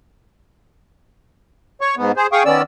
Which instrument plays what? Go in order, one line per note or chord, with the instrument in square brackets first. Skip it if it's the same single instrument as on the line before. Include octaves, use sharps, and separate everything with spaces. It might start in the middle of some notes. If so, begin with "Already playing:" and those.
[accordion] C#5 C#6
G#2 B3
G#4 C5
G#4 F5 G5 C#6 D#6
D#3 B3 C#4 D5 E6